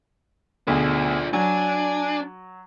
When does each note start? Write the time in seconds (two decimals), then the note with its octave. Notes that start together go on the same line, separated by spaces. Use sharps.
0.67 D2 B2 D4 F4 G#4
1.33 F#3 D4 G#5